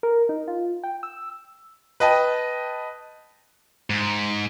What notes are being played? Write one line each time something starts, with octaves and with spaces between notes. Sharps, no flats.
A#4
D#4
F4
G5
E6
B4 D#5 G5 A5
G#2